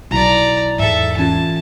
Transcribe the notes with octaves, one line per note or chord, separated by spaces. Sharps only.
B1 E4 D5 A5 A#5
E2 G#2 A4 E5
E3 C#4 F4 A5